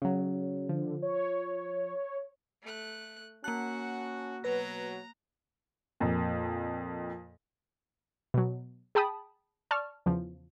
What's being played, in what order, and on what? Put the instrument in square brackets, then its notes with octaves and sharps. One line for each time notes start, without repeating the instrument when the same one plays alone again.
[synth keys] C#3 F#3
[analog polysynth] D3 [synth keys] F3
[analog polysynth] C#5
[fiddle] A3 F#6
[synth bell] A#3 F#6 [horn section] C#4 F#4 [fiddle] F#5 [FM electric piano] A5
[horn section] B2 F#3 [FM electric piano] B4 A#6 [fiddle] A#5
[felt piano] F2 A#2
[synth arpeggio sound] B2 F#3
G#4 G5 A5 B5 D#6
D5 A5 C#6 F6
E2 C#3 F3